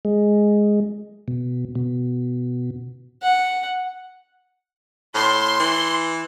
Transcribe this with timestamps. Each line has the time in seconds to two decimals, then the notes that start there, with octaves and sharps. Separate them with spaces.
0.05 G#3
1.28 B2
1.75 B2
3.22 F#5
5.14 A2 C6
5.60 E3